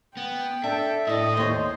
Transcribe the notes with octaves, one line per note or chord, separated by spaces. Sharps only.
B3 G5
D4 A4 E5
A2 E4 A4 D5 D#5
D#2 C5 C#5